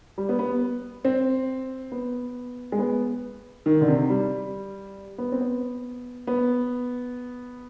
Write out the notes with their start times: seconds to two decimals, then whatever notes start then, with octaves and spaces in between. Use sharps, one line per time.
0.18 G3
0.29 B3
0.39 B3
1.05 C4
1.92 B3
2.72 G#3
2.79 B3
3.66 D#3
3.81 D3
3.88 C3
4.10 G3
5.18 B3
5.32 C4
5.41 B3
6.27 B3